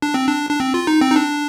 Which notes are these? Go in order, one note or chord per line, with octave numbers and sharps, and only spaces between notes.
D4
C4
D4
D4
C4
F4
D#4
C4
D#4
D4